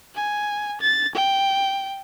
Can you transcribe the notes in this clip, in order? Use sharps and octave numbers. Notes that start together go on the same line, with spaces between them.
G#5
A6
G5